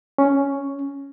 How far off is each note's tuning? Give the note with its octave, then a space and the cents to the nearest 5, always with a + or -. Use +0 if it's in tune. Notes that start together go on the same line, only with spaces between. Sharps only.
C#4 +5